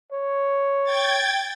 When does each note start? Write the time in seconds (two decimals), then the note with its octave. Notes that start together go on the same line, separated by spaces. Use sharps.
0.12 C#5
0.84 G5 G#6 A6